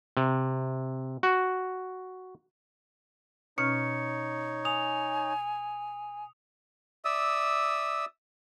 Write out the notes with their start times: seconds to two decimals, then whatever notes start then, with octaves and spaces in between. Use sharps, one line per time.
0.17 C3
1.23 F#4
3.58 B2 C#4 D#4 C#5 F6 C#7
4.65 G#5 D#6 F7
7.05 D5 E5 D#6 E6